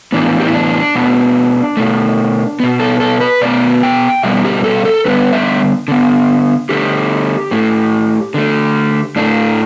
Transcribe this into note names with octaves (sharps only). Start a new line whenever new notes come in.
A2 E3 B3 D4
G4
E4
D4
B2 B3
B2 A3
B2 B3
A4
A4
B4
B2 B3 D5
G5
B2 G3 B3 E5
G4
A4
A4
D3 G3 B3 B4
E5
D3 B3
D3 A3 G4
A2 A3
D3 A3
A2 A3 D4